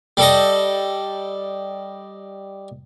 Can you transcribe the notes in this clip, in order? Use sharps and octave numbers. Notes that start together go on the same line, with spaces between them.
G3 A4 D#5